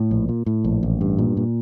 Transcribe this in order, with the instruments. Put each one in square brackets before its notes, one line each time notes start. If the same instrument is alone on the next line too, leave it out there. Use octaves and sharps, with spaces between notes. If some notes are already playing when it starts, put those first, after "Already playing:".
Already playing: [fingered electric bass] A2
A#1
A#2
A2
A#1
A1
G2
A#2
A#2